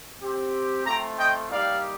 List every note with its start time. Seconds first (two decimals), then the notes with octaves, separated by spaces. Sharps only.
0.22 C4 G4
0.86 A3 C4 F4 G5 A#5
1.18 D#5 G5
1.50 G3 A#3 D#4 G4 D5 F5